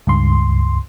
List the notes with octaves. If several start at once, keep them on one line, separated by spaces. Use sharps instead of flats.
C#2 G2 C6